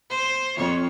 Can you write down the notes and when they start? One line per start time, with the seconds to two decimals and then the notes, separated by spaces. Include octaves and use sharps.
0.10 C5
0.56 F2 C#5